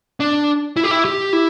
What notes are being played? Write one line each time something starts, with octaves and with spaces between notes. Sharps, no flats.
D4
E4
G4
E4
G4
E4